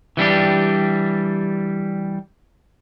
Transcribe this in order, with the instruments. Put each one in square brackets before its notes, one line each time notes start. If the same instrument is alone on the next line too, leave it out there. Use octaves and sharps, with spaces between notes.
[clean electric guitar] E3 G3 D4 G4